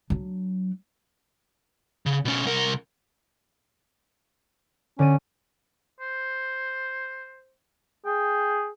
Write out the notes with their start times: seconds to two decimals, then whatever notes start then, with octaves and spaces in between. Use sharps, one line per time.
0.10 F#3 D4
2.06 C#3
2.25 B2 C#4
2.45 C2 A#4
4.99 D3 C#4 D5 D#7
6.00 C5
8.06 G#4 G5